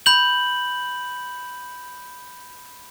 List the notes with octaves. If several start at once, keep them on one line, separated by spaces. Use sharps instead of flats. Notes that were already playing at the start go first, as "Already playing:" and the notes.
B5 G6 F#7